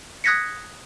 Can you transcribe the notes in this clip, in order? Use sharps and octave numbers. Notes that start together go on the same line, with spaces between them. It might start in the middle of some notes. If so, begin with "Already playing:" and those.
D#6 F#6 G#6 A#6 B6 C#7